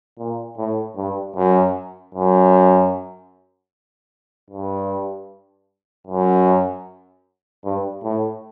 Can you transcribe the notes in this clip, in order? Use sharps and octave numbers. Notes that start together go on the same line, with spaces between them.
A#2
A2
G2
F#2
F#2
G2
F#2
G2
A2